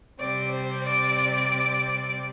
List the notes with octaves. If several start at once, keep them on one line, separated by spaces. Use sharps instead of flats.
C3 G3 C4 D5
C5
D5